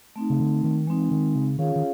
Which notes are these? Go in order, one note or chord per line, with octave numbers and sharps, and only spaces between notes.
A3 C4 D#4
C#3
D3
D#3
E3 G#3 C4 D#4
D#3
C#3
D#3 C#4 F4 G#4 C#5 F5
D#3